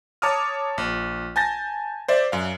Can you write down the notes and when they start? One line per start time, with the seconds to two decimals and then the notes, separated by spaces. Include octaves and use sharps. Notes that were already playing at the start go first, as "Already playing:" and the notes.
0.22 C#5 A5 A#5 D6 D#6 F6
0.78 A#1
1.36 G#5 A5 G6 A6 A#6
2.08 C5 D5 E5
2.32 F#2 F5